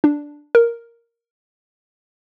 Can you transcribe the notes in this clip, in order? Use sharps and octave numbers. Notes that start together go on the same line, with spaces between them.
D4
A#4